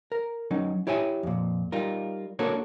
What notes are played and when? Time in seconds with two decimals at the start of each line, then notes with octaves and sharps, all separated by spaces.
0.12 A#4
0.51 F#3 C#4 D#4
0.87 E4 G4 C#5 E5 G#5
1.23 F2 A#2
1.72 G3 D#4 F4 A#4
2.39 A#3 D4 F#4 A4 A#4 C#5